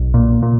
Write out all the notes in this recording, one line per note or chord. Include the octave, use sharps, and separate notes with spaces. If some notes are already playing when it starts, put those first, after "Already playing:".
Already playing: B1
A#2
A#2